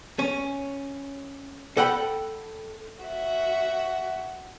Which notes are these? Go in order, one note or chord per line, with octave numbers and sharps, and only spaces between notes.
C#4
A4 F#5 G5 B5
F#4 E5